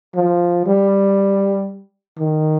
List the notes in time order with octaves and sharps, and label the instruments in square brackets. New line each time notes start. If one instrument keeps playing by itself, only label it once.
[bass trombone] F3
G3
D#3